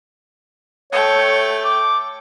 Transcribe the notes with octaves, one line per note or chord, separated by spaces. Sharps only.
A3 C#5 G5
D6